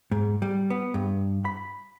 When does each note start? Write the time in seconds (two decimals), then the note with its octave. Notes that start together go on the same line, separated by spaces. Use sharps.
0.11 G#2
0.42 G3
0.70 B3
0.94 G2
1.45 B5